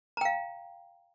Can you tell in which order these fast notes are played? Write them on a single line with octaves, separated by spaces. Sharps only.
A#5 G5 F5